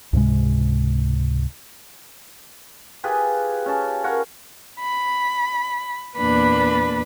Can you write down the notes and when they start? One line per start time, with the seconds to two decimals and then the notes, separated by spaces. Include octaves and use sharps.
0.13 C#2 G#2 C3 G#3
3.04 F4 G4 G#4 B4
3.66 C#4 A5
4.04 A#4 C#5 F5 F#5
4.79 B5
6.16 E2 A#2 A#3 D4 B4 B5